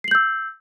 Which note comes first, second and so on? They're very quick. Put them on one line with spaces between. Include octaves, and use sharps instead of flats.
C7 F#7 G6 E6